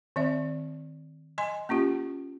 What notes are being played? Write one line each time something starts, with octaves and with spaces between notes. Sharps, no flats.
D#3 C4 D5 E5
D#5 G#5 C6
A#3 C#4 F4 G4